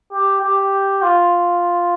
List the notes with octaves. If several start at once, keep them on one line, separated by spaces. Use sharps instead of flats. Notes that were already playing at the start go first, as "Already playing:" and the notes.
G4
G4
F4